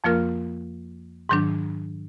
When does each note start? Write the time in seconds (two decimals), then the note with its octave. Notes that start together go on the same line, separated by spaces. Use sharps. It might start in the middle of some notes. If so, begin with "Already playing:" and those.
0.04 F2 F3 A#3 F4 A#4
1.29 G#2 D#3 F#3 D4